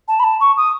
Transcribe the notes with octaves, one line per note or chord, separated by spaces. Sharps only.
A5
B5
A5
C#6
D#6